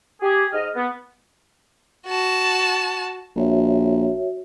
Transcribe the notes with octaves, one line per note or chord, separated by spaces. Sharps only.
G4 G#4
G#2 D#5 F6
B3
F#4 A5
A#1 F#4 C#5 E5